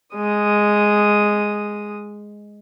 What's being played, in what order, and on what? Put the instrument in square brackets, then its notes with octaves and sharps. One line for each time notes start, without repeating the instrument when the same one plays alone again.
[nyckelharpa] G#3 D#6